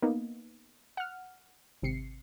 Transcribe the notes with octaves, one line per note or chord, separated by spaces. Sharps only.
A#3 B3 D#4
F#5 F6
G#1 C3 C7 C#7